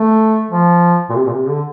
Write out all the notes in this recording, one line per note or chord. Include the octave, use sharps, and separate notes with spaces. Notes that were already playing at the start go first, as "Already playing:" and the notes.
Already playing: A3
F3
A#2
C3
A#2
C3
D3